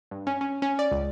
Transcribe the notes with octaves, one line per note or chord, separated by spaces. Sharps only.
G2
C#4
C#4
C#4
D5
C#2